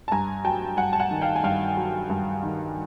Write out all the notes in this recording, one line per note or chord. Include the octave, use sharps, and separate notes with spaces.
A5
G2 G#5 A#5
F#3 G5 A5
G2 F#5 G#5
A5
F#5 G#5
D#3
F5 G5
G#5
G2 F5 G5
F#3
G2
D#3